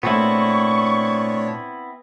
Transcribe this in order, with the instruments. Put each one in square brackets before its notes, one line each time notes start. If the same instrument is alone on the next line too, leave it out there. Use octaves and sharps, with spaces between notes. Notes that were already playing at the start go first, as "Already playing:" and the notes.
[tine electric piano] A#2 A3 [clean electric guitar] B3 C4 E4 [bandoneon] D4 C#5 [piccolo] C#6